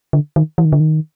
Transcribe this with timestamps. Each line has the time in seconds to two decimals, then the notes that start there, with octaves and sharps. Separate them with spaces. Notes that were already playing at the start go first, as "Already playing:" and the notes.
0.13 D3
0.36 D#3
0.58 E3
0.65 D#3
0.73 D3
0.80 D#3